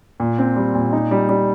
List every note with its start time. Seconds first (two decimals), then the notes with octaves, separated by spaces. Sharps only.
0.20 A#2
0.38 C4
0.56 G3
0.75 A#2
0.93 D#4
1.11 G3
1.29 G3